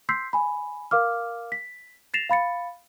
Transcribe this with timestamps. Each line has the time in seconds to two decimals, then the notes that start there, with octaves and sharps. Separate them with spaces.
0.09 C6 E6 G6 B6 C7
0.33 G#5 B5
0.91 A#4 F5 D6 F6
1.52 B6
2.14 A6 A#6 C7 E7 F7
2.29 F5 B5 A6 C#7